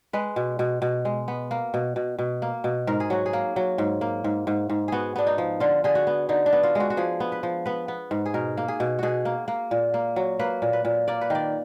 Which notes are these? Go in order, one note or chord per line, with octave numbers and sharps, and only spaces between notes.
G#3 B4
B2
B2
B2
G#3
B3
A#3
B2
B2
B2
A#3
B2
G#2 A#4
G#4
F#3 F#4
G#4
A#3
F#3
G#2
A#3
G#2
G#2
G#2
B3 F#4 G#4
B3 D4
D#4
F3
D3 F4
D3 G#4
F#4
B3
D3 D#4
D4
B3
F4
G#3 F#4
F#4
F3 G#4
B3
B4
F3
B3 B4
B3
G#2
G#4
B2 A#4
A#3
G#4
B2
B2 F#4 G#4
A#3
A#3
A#2
A#3
F#3
A#3 B4
A#2
B4
A#2
A#3 D5
B4
D#3 D5